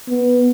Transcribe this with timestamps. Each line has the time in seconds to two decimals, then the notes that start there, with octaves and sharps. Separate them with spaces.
0.08 B3